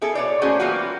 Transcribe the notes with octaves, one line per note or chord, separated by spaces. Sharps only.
B3 E4 G#4 A4
B2 C#5 D5
A3 A#3 C#4 F#4 G#4 C5
E3 G3 A#3 B3 F4 F#4